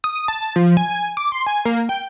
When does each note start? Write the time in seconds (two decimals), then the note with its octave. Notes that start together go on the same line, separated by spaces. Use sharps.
0.04 D#6
0.28 A5
0.56 F3
0.77 G#5
1.17 D6
1.32 C6
1.46 G#5
1.65 A#3
1.89 G5